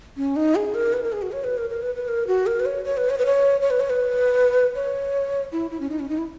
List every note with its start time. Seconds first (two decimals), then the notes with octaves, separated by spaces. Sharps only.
0.17 C#4
0.36 D#4
0.55 G#4
0.74 A#4
0.93 B4
1.03 A#4
1.13 G#4
1.22 F#4
1.32 C#5
1.44 B4
1.58 A#4
1.70 A#4
1.82 B4
1.95 B4
2.08 A#4
2.27 F#4
2.47 A#4
2.60 B4
2.66 C#5
2.84 C#5
2.97 B4
3.10 C#5
3.18 B4
3.26 C#5
3.61 C#5
3.70 B4
3.80 C#5
3.90 B4
4.75 C#5
5.52 E4
5.71 E4
5.80 C#4
5.90 D#4
6.00 C#4
6.09 D#4
6.18 E4